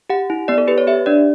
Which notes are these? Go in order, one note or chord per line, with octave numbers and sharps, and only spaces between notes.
G4 F#5
E4
B3 D5
A4
G4 B4
C#5
G4 E5
D4 D5